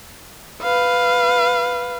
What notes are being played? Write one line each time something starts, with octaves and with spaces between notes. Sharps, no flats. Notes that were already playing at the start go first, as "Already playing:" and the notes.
B4 F5